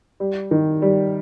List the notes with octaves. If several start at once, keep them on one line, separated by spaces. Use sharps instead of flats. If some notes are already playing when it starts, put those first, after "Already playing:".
G3
D#3
G3